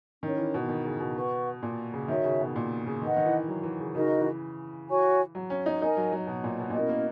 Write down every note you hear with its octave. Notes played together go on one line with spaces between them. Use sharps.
D#3 C#4 E4 A#4 C#5
E3
B2
D#3
C#3
B2
B4 F#5 C#6
A#2
C#3
D#3 F#4 C#5 E5
C#3
B2
A#2
C#3
D#3 B4 D#5 F#5
D#3
E3
F#3
E3
C#3
C#3 D#4 F#4 A#4 D#5
E3
F#4 C#5 G#5 C#6
F#3
C#4
D#4
D#4 A#4 D#5 G#5
F#3
F#3
B2
A#2
B2
A#2
B2 C#4 E4 A#4 D#5
A#3